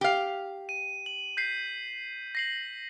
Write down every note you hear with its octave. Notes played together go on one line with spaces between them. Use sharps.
G4 F5
D#7
F#7
G6 B6 C7
A#6 C7 F#7